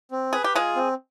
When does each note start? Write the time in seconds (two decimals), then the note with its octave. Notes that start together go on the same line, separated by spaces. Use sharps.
0.11 C4
0.33 G#4 B4
0.44 G4
0.54 G#3 F4 G#4
0.76 C4